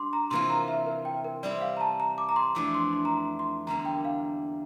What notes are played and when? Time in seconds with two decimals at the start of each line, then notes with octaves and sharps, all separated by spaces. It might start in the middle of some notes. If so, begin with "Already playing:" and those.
Already playing: G3 D4 C6 D6
0.13 A#5
0.30 C3 E3 A#3 F4 C6
0.50 A#5
0.68 E5
0.86 A#4
1.05 G5
1.24 A#4
1.43 G3 C4 E4 D5
1.61 F5
1.77 A#5
1.81 A5
2.00 A#5
2.18 D6
2.29 A#5
2.36 C6
2.55 F2 E3 A3 D4 D6
2.74 C6
2.93 C6
3.05 A#5
3.12 C6
3.39 C6
3.67 E2 D3 G3 A#3 A#5
3.85 G5
4.05 F5